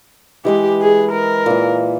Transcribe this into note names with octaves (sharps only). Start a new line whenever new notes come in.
E3 G#3 G4 B4
G#4
A#4
A#2 E3